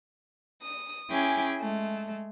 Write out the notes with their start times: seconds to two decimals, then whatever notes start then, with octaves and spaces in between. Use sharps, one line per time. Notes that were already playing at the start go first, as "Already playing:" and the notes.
0.62 D#6
1.09 C#4 E4 G#4 G5 G#5 D6
1.61 G#3 A3